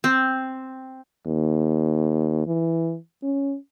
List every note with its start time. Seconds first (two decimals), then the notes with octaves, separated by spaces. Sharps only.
0.04 C4
1.27 D#2
2.47 E3
3.23 C#4